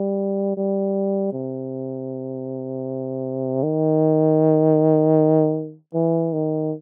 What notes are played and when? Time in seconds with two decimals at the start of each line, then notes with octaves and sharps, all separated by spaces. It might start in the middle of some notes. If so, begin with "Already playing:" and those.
Already playing: G3
0.57 G3
1.33 C3
3.63 D#3
5.94 E3
6.33 D#3